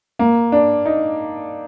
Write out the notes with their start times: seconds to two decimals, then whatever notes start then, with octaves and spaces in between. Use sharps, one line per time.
0.19 A#3
0.52 D4
0.86 D#4